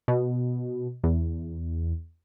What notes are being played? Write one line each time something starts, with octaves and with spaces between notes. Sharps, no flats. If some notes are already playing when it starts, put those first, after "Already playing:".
B2
E2